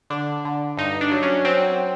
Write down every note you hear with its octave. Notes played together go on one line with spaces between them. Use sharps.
D3 D4
D3
G2 D#4
D4
F#3
C#4
F#3 C4